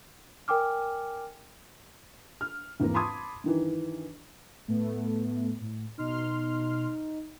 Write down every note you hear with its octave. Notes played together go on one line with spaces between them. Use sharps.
A#4 G5 G#5 D6 F6
F6
G#1 E2 A#3 A#4
A5 B5 C6 D6 D#6 G#6
G2 D#3 E3
A2 A3 B3
A2
B2 D#4 C6 F6